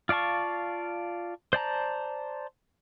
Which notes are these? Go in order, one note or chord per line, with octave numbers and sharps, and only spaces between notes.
F4 D5 F5 A5 C#6
C5 D5 A5 A#5